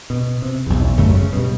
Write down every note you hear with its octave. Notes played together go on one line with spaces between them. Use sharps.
B2
C3
B1 E2
G1 F#2 A3
C#3
G2 B2